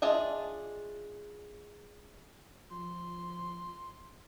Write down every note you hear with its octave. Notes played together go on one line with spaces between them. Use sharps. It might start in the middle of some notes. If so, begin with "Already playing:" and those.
D4 F4 G#4 D#5 E5
F3 C6